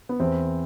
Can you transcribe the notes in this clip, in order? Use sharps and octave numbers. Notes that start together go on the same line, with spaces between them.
B3
E2 C4